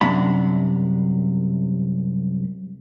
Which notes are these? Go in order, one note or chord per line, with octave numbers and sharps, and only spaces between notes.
C2 F#2 C3 D4 B5